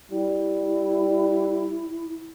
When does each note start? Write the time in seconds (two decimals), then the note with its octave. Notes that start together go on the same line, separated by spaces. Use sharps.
0.11 G3 E4